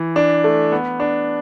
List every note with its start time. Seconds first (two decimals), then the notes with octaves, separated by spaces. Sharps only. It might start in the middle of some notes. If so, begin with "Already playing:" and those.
Already playing: E3
0.16 D4
0.44 A3
0.72 B3
1.00 D4